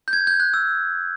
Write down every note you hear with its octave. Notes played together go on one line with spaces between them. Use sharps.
G6
G#6
G6
F#6
E6